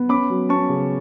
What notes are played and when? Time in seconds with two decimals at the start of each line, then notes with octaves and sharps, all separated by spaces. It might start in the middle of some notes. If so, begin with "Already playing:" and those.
Already playing: B3
0.09 C#4 B5 D6
0.30 F#3
0.49 C#4 A5 C#6
0.69 C#3